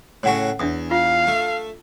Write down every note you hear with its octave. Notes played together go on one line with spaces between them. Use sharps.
A2 C#3 F#4 C#5 F#5 G#5
E2 D4 E5 D#6
F4 F5
A3